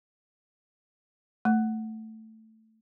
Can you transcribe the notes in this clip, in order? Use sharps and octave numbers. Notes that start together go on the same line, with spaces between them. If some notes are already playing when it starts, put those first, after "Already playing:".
A3